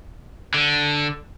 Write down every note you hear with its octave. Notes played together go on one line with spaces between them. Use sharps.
D3